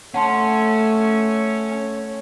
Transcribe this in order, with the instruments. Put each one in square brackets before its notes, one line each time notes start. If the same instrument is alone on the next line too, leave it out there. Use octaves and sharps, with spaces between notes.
[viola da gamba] A3 [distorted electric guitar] C#4 [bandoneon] C#5 [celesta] F#5 A5 C6